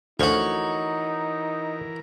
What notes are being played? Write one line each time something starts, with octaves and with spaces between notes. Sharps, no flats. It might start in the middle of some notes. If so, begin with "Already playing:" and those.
D2 E3 F3 D#4 F#4 A#4 C#5